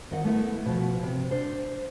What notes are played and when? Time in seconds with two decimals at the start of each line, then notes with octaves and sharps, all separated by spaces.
0.11 D#3 D#5 F#5
0.24 A3 B3 E4
0.66 B2 F3
1.03 C3
1.31 D4 C5